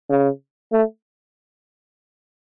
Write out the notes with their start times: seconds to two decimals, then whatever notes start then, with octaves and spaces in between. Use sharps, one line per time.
0.10 C#3
0.72 A3